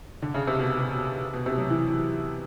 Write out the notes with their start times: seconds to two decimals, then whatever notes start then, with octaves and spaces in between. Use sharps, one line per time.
0.22 D3
0.34 C#3
0.47 C3
0.59 B2
0.79 B2
1.33 B2
1.46 C3
1.58 F#3
1.70 E3